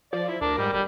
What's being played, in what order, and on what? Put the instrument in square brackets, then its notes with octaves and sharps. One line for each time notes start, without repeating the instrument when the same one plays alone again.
[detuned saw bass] F3 [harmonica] D5
[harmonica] E4
[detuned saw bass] D2 [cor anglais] D4 [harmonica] A#4
[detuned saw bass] G#2 [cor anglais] G3
[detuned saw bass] D1 [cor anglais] G3